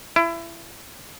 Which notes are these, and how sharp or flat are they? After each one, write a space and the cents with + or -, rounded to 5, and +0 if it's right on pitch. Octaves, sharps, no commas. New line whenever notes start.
E4 +25